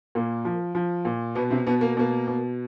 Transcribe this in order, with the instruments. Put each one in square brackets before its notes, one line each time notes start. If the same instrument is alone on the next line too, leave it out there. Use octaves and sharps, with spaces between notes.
[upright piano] A#2 A#3
F3
F3
A#2
B2 B3
C3 C4
B2 B3
A#3
B2 A#3
B2